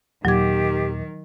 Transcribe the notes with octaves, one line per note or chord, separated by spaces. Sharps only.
D#2 A#2 D#3 F#3 G4 D6 G#6